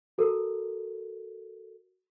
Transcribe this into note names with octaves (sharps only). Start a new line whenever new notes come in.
F#4 A4 A#4